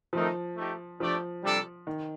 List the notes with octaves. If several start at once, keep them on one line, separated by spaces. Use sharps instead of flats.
D#3 F3 A3 C4 D#4 A#4
A3 D#4 G4
F3 A3 D4 G4 D5
C3 G3 D4 A4 D5
D#3